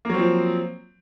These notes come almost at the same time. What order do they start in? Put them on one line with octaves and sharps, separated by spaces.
A#3 F#3 C4 F3